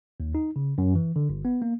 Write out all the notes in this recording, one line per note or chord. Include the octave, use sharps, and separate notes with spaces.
D#2
D#4
C#3
F#2
E3
D3
G1
B3
A#3